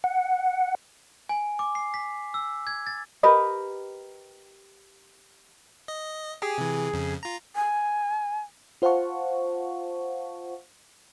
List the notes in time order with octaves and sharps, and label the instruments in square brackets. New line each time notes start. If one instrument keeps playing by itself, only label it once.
[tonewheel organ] F#5
[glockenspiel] G#5
D6
C7
B6
E6
G#6
A6
[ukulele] G4 A#4 B4 D#5
[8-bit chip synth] D#5
[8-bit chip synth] G4 [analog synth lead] G#4
[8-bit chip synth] C3 E3
F2 C#3
F4 A#5
[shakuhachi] G#5
[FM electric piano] F4 C5 F5 F#5 A5 C#6